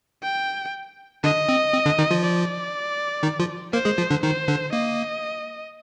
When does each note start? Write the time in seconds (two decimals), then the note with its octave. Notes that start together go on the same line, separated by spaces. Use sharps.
0.23 G5
1.24 D3 D4 D#5
1.49 C4
1.73 C4
1.86 D3 D4
1.99 D#3 D#4
2.11 F3 F4
2.24 D5
3.23 D#3 D#4
3.40 F3 F4
3.73 A#3 A#4 C5
3.85 G#3 G#4
3.98 F3 F4
4.10 D3 D4
4.23 D#3 D#4 C5
4.48 D3 D4
4.72 A#3 D#5